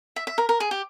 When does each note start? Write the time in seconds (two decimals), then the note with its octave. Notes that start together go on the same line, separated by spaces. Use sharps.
0.16 E5
0.27 E5
0.38 A#4
0.49 A#4
0.60 G#4
0.71 G4